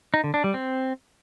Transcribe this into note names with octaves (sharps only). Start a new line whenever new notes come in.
D#4
D3
D4
G3
C4